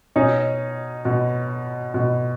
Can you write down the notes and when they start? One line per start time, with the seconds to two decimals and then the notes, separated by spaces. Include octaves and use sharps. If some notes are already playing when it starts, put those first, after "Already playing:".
0.16 B2 C#4 D#4
1.05 B2
1.94 B2